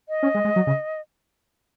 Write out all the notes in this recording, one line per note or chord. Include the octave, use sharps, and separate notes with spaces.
D#5
C#4
G#3
G#3
F#3
C#3